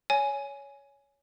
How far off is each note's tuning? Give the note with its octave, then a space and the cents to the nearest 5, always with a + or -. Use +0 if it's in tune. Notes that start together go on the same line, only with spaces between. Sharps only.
C#5 +15 G#5 +5